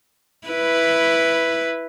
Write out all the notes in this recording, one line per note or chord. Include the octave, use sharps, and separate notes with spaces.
E4 B4